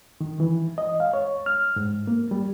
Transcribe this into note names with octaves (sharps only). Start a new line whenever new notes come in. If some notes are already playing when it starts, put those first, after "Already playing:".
D#3
E3
D#5
F5
C#5
F6
G#2
A#3
G3